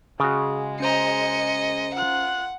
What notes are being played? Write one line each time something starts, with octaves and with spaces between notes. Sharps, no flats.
C#3 G#3 F#4 G#4
C#4 C5 D#5 A#5 C#7
F4 F#5 F#6